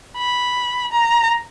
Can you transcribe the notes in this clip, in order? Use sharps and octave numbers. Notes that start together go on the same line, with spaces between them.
B5
A#5